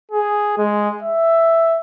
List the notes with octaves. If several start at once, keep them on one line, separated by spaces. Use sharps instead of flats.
G#4
G#3
E5